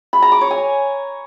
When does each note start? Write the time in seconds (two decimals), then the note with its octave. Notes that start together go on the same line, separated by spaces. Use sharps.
0.13 B5
0.22 A#5
0.32 D6
0.41 C#5
0.51 G#5